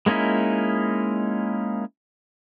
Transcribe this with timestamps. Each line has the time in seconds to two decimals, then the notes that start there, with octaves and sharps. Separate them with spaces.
0.06 G#3 A#3 C#4 D#4 E4